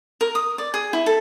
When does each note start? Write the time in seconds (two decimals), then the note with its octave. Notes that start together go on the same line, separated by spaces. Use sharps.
0.21 A#4
0.35 D#6
0.58 D5
0.74 G#4
0.93 E4
1.06 A4